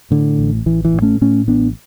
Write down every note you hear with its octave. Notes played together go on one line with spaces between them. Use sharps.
A2 D3
A1
A1 E3
E3
A2
A3 C#4
A2 A3 C#4
A1 B3 D4